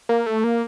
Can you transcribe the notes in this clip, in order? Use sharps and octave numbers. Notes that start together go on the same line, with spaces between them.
A#3
A3
A#3